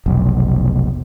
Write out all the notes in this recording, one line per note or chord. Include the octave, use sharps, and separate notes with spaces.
F1 B1